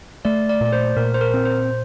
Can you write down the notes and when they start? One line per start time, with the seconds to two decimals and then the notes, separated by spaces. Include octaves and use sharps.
0.25 A3 D5
0.49 D5
0.61 A#2 D5
0.73 C5
0.97 A#2 A#4
1.14 C5
1.21 A#4
1.34 C4
1.45 C5